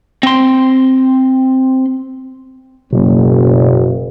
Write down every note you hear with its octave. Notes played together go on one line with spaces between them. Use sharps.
C4 C6
F#1 B2